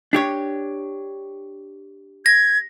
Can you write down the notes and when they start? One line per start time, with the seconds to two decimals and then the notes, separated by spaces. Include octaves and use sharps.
0.13 D4 G4 C#5
2.26 G#6 A#6